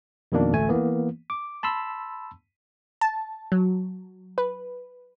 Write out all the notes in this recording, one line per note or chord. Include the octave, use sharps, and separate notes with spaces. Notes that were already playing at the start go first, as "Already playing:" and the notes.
F2 B2 D#3 A#3 D4
A1 D2 A3 G#5
E3 A#3 B3
D6
A5 B5 C6 E6
A5
F#3
B4